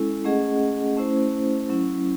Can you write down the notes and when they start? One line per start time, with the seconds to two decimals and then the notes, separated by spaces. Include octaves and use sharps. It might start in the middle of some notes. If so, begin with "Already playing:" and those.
Already playing: G#3 C#4 E4 A4
0.24 A3 C#4 G#4 D#5 F#5
0.97 A3 C#4 E4 C5
1.69 F#3 C#4 E4